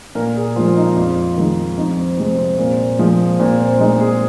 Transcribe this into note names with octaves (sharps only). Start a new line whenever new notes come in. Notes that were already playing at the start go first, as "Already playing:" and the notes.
A#2 A#4
G#4
F3 G#3 F4
F4
D#4
F2 F4
D#3 G#3
F2 D#4
C4
C3 G#3 C4
C4
A#2 C4
F3 G#3
A#2 C4
C4
G#3 D#4
G#4